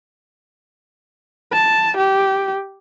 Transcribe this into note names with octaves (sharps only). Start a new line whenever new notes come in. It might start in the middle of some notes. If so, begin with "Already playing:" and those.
A5
G4